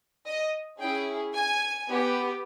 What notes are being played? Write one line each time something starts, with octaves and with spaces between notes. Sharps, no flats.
D#5
C#4 E4 G#4 G5
G#5
B3 G4